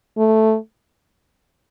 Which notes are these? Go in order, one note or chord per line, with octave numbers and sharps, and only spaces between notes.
A3